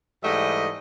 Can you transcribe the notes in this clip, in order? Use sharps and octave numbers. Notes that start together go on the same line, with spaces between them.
G#2 E3 G3 A3 D#5